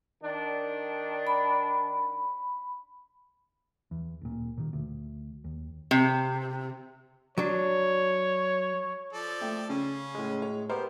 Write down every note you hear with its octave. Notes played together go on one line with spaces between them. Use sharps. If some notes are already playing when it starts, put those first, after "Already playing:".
D#3 D4
B5
E2
D1 A#2
A#2 D#3
D2
D#2
C3
F#3 D4 C#5
F3 A4 D5
A3 G5
C#3 C#4
A2 G#3
C#5
B3 G4 A#4 C5